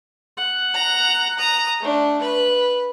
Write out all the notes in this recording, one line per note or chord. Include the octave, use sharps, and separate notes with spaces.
F#5
A#5
A#5 D#6
A3 D4
B4 B5